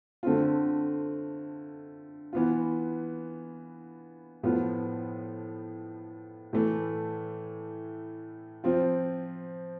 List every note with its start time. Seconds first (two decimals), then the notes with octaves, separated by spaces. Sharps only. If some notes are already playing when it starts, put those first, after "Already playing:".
0.23 D3 A3 C4 F4
2.33 E3 B3 F4
4.43 A2 F3 B3 F4
6.53 A2 E3 A3
8.64 F3 C4 F4